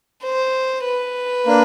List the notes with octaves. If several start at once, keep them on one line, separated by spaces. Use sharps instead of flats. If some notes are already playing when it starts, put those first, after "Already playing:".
C5
B4
A#3 D4